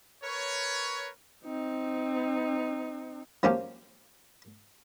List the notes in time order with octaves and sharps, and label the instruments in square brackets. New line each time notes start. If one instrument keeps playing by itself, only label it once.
[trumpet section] A#4 B4 C#5
[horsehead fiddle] C4 D#4
[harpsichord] F3 F#3 A#3 C#4 F4 G4